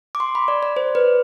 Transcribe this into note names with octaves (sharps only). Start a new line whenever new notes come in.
D6
C6
B5
D5
D5
C5
B4